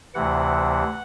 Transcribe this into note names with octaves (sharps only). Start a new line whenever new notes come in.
D2 C3 E3 F#5